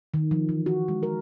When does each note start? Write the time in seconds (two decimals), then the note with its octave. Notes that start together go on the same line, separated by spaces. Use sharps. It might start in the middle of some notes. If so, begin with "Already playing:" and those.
0.14 D#3
0.31 F3
0.49 E3
0.66 F#4
0.88 G#3
1.03 A#4